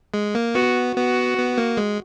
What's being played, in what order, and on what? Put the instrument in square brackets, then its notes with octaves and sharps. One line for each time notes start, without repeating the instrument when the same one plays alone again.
[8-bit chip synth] G#3
A#3
[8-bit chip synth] B3 [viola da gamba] F#4
[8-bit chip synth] B3 [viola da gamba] F#4
[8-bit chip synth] B3
A#3
G#3